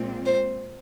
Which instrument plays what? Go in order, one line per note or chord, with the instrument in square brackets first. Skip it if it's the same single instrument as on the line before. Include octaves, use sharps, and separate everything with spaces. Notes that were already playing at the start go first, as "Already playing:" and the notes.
Already playing: [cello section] A#2 G#3 C4 F4
[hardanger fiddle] C5